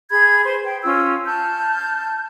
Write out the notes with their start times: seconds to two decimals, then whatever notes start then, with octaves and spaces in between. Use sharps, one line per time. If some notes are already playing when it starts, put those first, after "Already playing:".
0.10 G#4 B5 G#6
0.44 B4 C5 C6
0.65 G5
0.83 C#4 F4 E6
1.26 A5 F6 G6